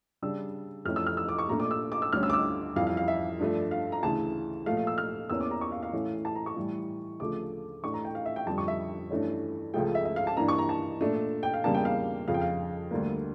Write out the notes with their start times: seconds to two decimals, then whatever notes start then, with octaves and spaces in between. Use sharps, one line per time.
0.22 C#3 G3 D4 E6
0.85 F2 E3 A3 C#4 F6
0.96 E6
1.07 F6
1.17 E6
1.29 D6
1.39 C#6
1.49 A#2 A3 D4 A#5
1.60 D6
1.71 E6
1.92 D6
2.02 E6
2.13 D2 D3 G3 C#4 F6
2.23 E6
2.30 D6
2.33 E6
2.76 F2 E3 G3 F5
2.87 F5
2.97 F5
3.08 E5
3.39 G2 F3 A3 D4
3.71 F5
3.92 A#5
4.03 D2 C#3 E3 A5
4.66 A#2 F3 A3 F5
4.77 F5
4.87 E6
4.98 F6
5.30 E2 E3 A#3 C#4 E6
5.41 D6
5.51 A#5
5.61 C#6
5.72 F5
5.83 F5
5.93 A2 E3 A3 C#4
6.25 A5
6.35 A#5
6.46 C#6
6.57 A2 E3 G3
7.20 D2 C#3 F3 A3 D6
7.84 A2 E3 A3 D4 C#6
7.94 A#5
8.05 G5
8.15 F5
8.26 E5
8.36 G5
8.47 F2 D3 G3 A5
8.58 C#6
8.68 E5
9.10 G2 E3 A3 C#4
9.74 C#2 C#3 F3 A3 G5
9.95 E5
10.05 E5
10.16 F5
10.27 A5
10.37 G2 E3 A#3 D4 A#5
10.48 C#6
10.58 A#5
10.69 A5
11.01 A#2 A3 D4
11.43 G5
11.54 F5
11.64 E2 C#3 G3 A#3 D4 A5
11.75 G5
11.85 F5
12.28 F2 C#3 F3 F5
12.34 G5
12.42 F5
12.91 D2 D3 G3 A#3